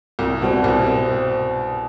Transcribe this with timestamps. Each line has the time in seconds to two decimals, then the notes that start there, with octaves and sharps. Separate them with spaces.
0.19 C2
0.42 B2 G3 C4
0.64 C2
0.86 C4